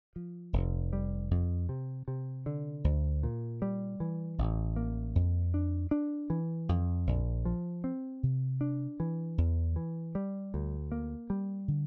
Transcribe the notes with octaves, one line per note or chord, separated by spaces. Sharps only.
F3
F1
G3
F2
C3
C3
D3
D2
A#2
G3
E3
A1
A#3
F2
D4
D4
E3
F2
A#1
F3
C4
C3
D4
E3
E2
E3
G3
D2
A#3
G3
D3